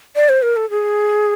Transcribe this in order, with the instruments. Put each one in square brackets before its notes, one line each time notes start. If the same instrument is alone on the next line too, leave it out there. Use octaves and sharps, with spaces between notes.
[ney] D5
C5
A#4
A4
G#4